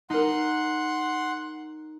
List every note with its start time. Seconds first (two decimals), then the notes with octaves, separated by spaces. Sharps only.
0.10 D#4 A#4 F#5 C6